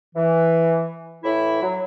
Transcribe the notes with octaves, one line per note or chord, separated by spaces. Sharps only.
E3
A2 E3 E4
F#3